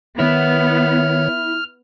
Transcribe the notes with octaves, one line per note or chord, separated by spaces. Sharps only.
D#3 B3 E4 C#5 F6